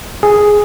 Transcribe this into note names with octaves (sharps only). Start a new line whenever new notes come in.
G#4